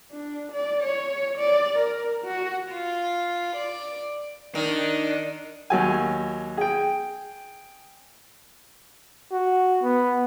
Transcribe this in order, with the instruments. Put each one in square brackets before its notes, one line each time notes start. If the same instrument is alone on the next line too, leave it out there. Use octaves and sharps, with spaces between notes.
[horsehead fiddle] D4
D5
C#5
D5
A#4
F#4
[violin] F4
D5
[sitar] D#3 [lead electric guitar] D4
[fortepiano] D#2 F#3 G#5
G#4 G5
[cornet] F#4
B3